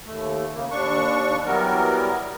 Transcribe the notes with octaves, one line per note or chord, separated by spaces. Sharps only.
D#2 A3
C#3 A#3
D#2 D4 C#6
E3 F#3 G3 B3 A#4